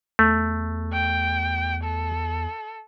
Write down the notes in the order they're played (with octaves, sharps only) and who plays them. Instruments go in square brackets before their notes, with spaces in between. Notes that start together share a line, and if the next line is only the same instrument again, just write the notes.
[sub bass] E2 [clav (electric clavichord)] A3
[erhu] G5
A4